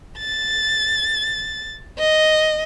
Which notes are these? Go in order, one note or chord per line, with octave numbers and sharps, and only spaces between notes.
A6
D#5